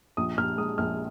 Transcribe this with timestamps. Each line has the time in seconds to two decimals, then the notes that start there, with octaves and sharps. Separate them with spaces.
0.17 A#1 D#6
0.37 A#1 F6
0.58 G#3 D#6
0.78 A#1 F6